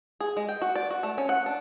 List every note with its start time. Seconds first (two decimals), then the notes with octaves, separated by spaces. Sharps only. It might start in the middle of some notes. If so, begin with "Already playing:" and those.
0.20 G#4
0.37 G#3
0.49 G5
0.62 F#4
0.75 D5
0.90 F#4
1.03 A3
1.18 C#4
1.29 F#5
1.46 D4